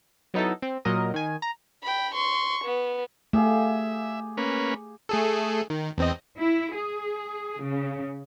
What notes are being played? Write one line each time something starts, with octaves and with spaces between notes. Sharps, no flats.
F#3 B3 D#4 E4 A4
C4
A#2 F#3 A#4 D#5
D#3 G#5
A#5 A#6
G5 B5
C6 C#6
B3
A3 G4 G#4 E5 F5
A#3 C#4 B4
A3 G#4 A4
D#3
E2 C4 D#5
E4
G#4
C#3